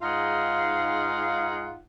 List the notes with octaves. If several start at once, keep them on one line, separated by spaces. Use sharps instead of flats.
G#2 D#4 F4 G#4 F5 F#5